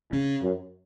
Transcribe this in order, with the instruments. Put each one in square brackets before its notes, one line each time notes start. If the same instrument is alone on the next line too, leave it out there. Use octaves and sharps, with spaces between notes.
[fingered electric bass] C#3 C#4
[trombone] F#2